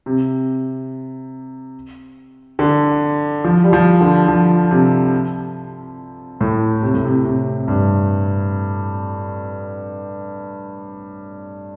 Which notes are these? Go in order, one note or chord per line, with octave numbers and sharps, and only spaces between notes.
C3
D3
F3
G3
F3
D3
F3
C3
A2
C3
A2
C3
C3
G2